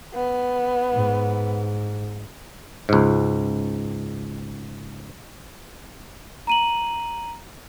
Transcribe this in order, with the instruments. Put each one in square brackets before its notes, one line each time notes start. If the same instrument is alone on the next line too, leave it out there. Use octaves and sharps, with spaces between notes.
[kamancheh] B3
[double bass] G#2
[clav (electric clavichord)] C#2 G#2
[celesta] A#5 D#7 F#7